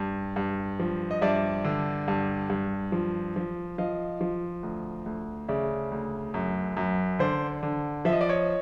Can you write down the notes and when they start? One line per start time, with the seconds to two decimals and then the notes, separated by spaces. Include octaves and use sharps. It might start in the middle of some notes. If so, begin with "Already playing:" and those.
Already playing: G2
0.36 G2
0.79 F3
1.11 D#5
1.21 G2 D5 E5
1.65 D3
2.08 G2
2.50 G2
2.92 F3
3.36 F3
3.78 F3 D#5 F5
4.21 F3
4.63 D2
5.06 D2
5.48 C#3 D5 E5
5.91 D2
6.34 F#2
6.77 F#2
7.19 D3 C5 D5
7.63 D3
8.05 F3 E5
8.13 D#5
8.21 D5
8.29 C#5 D#5